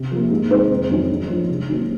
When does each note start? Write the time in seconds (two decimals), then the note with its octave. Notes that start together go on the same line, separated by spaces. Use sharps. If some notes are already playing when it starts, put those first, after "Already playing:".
Already playing: C3
0.11 F3 A#3
0.31 G#2
0.50 D#3 G#3 C4 D#4
0.70 F1
0.90 F2 D#3 F#3 C#4
1.10 A#1
1.29 G#2 F3 G#3 C#4
1.49 C3
1.68 D#3 F#3 A#3 C#4